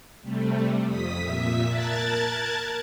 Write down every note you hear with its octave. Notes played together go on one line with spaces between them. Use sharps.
C3 G3 A3
F2 D#6 B6
A#2 E5 B6
A#4 A5 F#6 G#6 A6